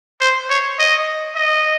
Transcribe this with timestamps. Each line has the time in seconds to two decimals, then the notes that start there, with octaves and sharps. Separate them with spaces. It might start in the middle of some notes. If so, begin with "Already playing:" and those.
0.21 C5
0.50 C#5
0.79 D#5
1.36 D#5